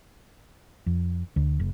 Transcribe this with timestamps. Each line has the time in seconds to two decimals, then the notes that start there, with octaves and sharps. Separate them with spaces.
0.86 F2
1.36 D2
1.60 F#1